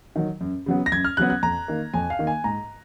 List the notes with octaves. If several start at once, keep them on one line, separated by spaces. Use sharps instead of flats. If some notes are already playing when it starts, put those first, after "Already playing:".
D#3 F#3
F#2
C#3 F#3 B3
A#6
F#2 G#6
F6
C#3 F#3 B3 F#6
F#6
F2 A#5
D#3 A#3
F2 G#5
F5
D#3 A#3
G#5
G#2 A#5